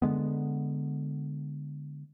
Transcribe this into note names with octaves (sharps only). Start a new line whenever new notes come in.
D3 G#3 B3